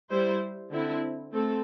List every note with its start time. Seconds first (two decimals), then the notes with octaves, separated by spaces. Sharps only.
0.10 G3 E4 C5
0.70 D3 C4 E4
1.32 A3 C4 A4